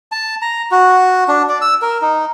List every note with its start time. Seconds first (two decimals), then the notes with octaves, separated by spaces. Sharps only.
0.12 A5
0.42 A#5
0.71 F#4
1.28 D4
1.49 D5
1.61 E6
1.82 A#4
2.02 D#4